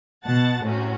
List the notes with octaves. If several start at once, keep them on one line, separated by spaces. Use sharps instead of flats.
B2 F#5 A5 A6
A2 C3 C#4 F#4